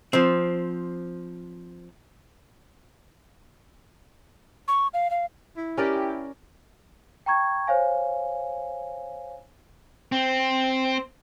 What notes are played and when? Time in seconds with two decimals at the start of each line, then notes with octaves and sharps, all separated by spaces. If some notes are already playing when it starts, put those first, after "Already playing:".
0.13 F3 C4
4.68 C#6
4.94 F5
5.11 F5
5.57 E4
5.77 C#4 G4 A#4 D5
7.26 G5 A#5 C#6 G#6
7.67 C5 C#5 F5 G#5
10.12 C4